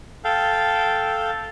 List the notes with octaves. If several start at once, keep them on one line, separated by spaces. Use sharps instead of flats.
A4 F5 G5